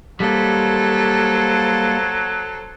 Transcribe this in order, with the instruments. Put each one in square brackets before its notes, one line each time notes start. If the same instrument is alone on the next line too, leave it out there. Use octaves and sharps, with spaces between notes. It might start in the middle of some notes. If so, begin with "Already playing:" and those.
[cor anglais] F#3 [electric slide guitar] G3 A#3 [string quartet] A4 C5